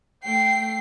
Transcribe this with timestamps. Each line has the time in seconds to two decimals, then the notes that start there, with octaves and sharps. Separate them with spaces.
0.24 A3 G5 C7